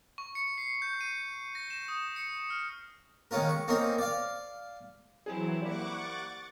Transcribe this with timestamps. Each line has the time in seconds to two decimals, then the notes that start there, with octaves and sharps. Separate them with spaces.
0.18 C#6
0.35 C#7
0.58 C7
0.82 G6
1.01 D#7
1.55 A#6
1.70 E7
1.88 D#6
2.16 C#7
2.50 F6
3.31 D#3 G#3 C#4 F4 A#4
3.49 C#6
3.68 A#3 C4 C#4 D#4 A#4
3.98 D5 F5
5.26 E3 F#3 C4 E4 G#4
5.62 G3 A#3 F#5 C#6 D6
6.00 A6